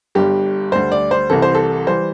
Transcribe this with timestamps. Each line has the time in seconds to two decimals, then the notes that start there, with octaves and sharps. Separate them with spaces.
0.15 G1 G2 G3 G4
0.72 D2 D3 G3 C5
0.92 D5
1.11 C5
1.30 C2 C3 E3 G3 A4
1.42 C5
1.55 A4
1.87 E3 G3 C5